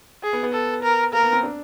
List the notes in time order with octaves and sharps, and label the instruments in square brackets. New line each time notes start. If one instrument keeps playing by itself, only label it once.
[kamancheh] G#4
[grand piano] B3
B3
[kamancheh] A4
A#4
[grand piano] A#3 [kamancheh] A#4
[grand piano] B3
C4
D4